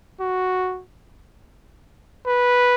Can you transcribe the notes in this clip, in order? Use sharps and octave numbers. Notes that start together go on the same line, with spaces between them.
F#4
B4